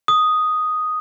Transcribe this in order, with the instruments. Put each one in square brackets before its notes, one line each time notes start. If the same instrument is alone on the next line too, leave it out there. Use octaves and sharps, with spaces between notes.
[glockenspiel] D#6